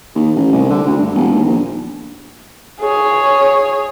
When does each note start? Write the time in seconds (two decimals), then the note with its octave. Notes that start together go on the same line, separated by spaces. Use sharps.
0.15 D#2
0.36 A1
0.52 C2
0.70 D3
0.86 D2
0.98 G2
1.15 E1
1.32 D#2
1.45 A#1
2.80 G#4 C#5